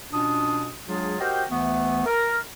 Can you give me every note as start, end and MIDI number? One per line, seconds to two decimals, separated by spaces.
0.13 0.68 47
0.13 0.68 61
0.13 0.68 62
0.13 0.68 65
0.13 0.68 87
0.88 1.16 54
0.88 1.16 56
0.88 1.16 62
0.88 1.16 65
0.88 1.16 68
1.20 1.44 66
1.20 1.44 67
1.20 1.44 70
1.20 1.44 72
1.20 1.44 75
1.20 1.44 79
1.51 2.04 38
1.51 2.04 52
1.51 2.04 57
1.51 2.04 59
2.06 2.37 70